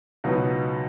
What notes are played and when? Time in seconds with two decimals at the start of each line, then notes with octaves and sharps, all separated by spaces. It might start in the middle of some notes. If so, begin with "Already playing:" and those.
0.24 C#2 B2 F#3 B3 D#4